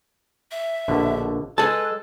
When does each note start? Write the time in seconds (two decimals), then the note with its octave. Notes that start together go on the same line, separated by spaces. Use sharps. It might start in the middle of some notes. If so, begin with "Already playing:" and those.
0.51 E5
0.88 A#1 B2 D3
1.58 G#3 G#4 A4 B4 A5